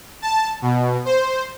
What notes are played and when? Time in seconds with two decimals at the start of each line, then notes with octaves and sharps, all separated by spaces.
0.22 A5
0.62 B2
1.05 C5